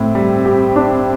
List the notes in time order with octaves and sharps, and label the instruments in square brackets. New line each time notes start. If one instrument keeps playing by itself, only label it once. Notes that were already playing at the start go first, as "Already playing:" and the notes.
Already playing: [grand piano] A2 [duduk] C4
[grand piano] G3
G4
D4